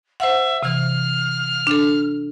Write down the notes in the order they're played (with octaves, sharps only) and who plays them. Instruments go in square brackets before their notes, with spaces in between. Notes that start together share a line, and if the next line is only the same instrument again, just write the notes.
[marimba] C5 F#5 [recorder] E5
[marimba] C3 E3 [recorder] F6
[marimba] D4 A4